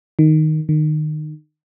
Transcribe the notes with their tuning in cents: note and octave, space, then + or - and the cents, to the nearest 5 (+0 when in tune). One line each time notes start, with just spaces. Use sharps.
D#3 +0
D#3 -25